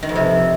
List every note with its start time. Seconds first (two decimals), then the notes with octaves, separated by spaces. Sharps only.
0.03 D#3
0.09 F2
0.16 C3